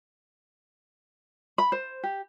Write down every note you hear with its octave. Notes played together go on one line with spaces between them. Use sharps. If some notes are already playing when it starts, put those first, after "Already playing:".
B5
C5
G4